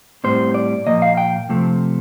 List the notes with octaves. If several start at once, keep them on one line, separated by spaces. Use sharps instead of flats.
A2 G3 C4 C5
D5
A#2 F3 A#3 D#5
F5
G5
C3 F3 A3 C4